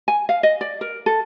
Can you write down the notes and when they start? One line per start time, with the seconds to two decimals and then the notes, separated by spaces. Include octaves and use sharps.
0.08 G#5
0.29 F5
0.43 D#5
0.61 D5
0.81 A#4
1.06 A4